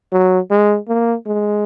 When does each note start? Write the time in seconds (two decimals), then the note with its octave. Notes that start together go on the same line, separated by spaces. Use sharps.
0.12 F#3
0.51 G#3
0.88 A#3
1.26 G#3